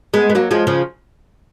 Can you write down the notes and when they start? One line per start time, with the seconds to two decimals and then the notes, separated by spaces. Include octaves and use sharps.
0.14 G#3 B3
0.30 B3
0.35 F#3 A#3
0.51 F3 G#3
0.67 C#3 F3